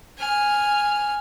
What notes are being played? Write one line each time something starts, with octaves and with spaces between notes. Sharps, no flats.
G#5 F6